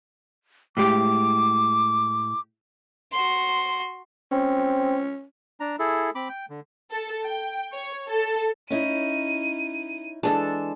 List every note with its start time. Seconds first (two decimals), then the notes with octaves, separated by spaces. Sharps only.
0.77 A2 G#3 G4 D6
3.12 F#4 C6
4.32 C4 C#4
5.60 D4 A#5
5.79 E4 G#4 A4
6.15 C4 B5 D6
6.29 G5
6.50 D3
6.91 A4
7.25 G5
7.73 C#5
8.09 A4
8.70 C#4 D#4 E4 D#7
10.23 E3 G#3 D4 A4 A5